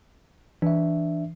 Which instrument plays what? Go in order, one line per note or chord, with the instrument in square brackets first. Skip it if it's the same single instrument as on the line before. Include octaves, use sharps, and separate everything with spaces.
[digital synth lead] E3 [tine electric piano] D4 E5